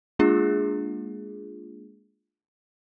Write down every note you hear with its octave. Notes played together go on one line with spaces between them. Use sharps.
G#3 A#3 D4 F4 G#4